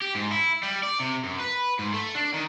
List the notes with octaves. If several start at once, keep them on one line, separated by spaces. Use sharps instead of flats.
G4
G#2
E4
G3
D5
C3
F#2
B4
G#2
A3
D4
D#3